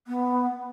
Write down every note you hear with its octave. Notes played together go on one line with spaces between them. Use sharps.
B3